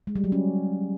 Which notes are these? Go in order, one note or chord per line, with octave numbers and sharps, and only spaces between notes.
G#3
G3
F#3
C#4